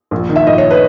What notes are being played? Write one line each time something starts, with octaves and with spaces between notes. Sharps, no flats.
A#1
D#3
E5
A#1 D#5
C#5
B4